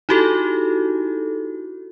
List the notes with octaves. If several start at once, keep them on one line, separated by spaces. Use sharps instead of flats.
D#4 E4 F#4 G4 A4